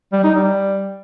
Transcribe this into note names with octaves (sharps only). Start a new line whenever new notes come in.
G3
D#4
G3